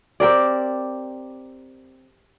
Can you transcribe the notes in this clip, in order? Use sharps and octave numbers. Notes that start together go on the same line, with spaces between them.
C4 G4 A#4 D5